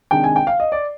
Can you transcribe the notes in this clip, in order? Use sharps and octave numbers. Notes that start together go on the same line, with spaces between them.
C3 D#3 G#3 D4 G5
G#5
G5
F5
D#5
D5